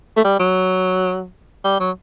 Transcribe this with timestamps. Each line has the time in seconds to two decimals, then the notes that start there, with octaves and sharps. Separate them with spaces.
0.17 A3
0.24 G3
0.40 F#3
1.64 G3
1.80 F#3